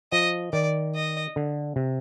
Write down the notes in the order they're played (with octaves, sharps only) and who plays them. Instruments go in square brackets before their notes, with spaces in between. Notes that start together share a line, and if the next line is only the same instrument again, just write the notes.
[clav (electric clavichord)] F3 [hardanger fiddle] D#5
[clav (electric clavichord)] D#3 [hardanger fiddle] D5
[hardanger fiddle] D#5
[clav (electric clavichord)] D3
C3